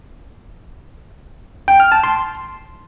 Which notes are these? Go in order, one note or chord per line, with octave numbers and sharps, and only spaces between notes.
G5
F6
A5
C6